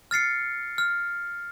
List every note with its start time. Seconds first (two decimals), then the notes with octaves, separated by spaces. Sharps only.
0.11 F6 A6 C7 C#7
0.78 F6